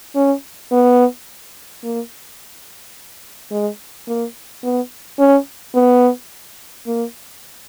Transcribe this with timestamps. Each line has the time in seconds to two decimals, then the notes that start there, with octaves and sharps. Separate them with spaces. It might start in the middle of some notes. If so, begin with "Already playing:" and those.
0.16 C#4
0.72 B3
1.83 A#3
3.51 G#3
4.08 A#3
4.64 B3
5.19 C#4
5.75 B3
6.87 A#3